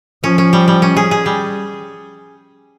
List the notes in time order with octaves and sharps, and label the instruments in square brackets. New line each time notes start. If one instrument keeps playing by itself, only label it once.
[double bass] F3 [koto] C#4
[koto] C#4
G3
G3
C#4
G#4
G#4
G3